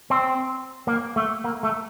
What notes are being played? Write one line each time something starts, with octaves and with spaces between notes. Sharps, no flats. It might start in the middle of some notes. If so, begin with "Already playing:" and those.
C4
A#3
A3
A#3
A3